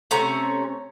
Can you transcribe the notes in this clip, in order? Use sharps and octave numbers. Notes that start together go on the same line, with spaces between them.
C3 A3 C#4 A#5